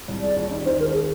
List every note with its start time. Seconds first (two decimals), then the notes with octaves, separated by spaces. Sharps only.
0.08 C2
0.22 G#3 D5
0.36 D#2
0.51 D#4
0.66 D#3 C5
0.80 G#3 A#4
0.94 G#4